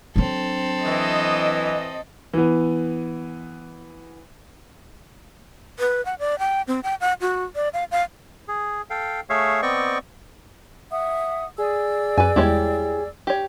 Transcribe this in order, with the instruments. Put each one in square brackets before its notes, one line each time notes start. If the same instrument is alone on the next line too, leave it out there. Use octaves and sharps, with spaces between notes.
[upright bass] F#3 D4 [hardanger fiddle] C4 A4
[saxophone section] E3 [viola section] D#5
[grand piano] E3 B3
[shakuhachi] B4
F#5
D5
G5
C4
G5
F#5
F#4
D5
F5
F5
[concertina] G#4
A4 F5 G5
A3 G#4 C#5 E5 F5
B3 C4 D5 D#5 G5 C#6
[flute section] E5 F#5 D#6
[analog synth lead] G#4 [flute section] D5 E6
[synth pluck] F#2 [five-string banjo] B4 G#5
[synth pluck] E2 G3 G#3 [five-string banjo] E4 G4 C#5
[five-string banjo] G4 C#5